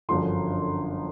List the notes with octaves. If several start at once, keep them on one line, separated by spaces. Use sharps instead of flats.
G1 F#2 D3 F3 C6